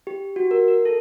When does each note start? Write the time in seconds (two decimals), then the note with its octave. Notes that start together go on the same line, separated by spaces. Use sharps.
0.07 G4
0.36 F#4
0.51 A#4
0.68 A#4
0.85 A4